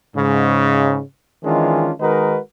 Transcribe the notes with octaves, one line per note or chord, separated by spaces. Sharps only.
G#2 C#3
D#3 E3 G#3 C#4 D4 F4
D#3 G#3 D#4 F#4 A#4 B4